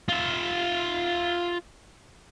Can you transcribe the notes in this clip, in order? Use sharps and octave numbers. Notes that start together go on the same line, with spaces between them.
F4 E5